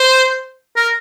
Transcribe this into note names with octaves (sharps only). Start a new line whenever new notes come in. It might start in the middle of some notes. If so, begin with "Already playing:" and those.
Already playing: C5
A#4